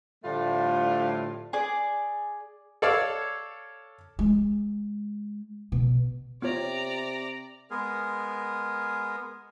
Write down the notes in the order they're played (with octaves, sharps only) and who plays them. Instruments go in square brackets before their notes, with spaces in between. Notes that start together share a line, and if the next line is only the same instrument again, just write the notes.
[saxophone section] A2 D3 F3 G3 A3 F4
[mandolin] G#4 D5
[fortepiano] A4 C#5 D5 F5
[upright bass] G#3
B2
[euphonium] C3 [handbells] B3 F4 C#5 [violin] D5 A#5
[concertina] G#3 B3 G#4 A#4